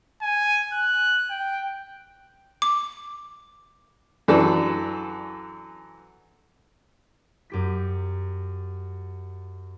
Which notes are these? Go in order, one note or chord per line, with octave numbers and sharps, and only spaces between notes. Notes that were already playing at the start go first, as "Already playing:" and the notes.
G#5
F#6
G5
D6
F#2 E3 D4 F#4 A4
F#2 G4 B6